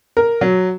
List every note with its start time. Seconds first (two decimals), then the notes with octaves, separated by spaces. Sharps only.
0.17 A#4
0.41 F#3